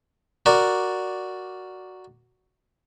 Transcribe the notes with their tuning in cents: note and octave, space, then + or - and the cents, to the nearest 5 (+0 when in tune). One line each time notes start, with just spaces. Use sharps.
F#4 +0 A#4 +0 D5 +0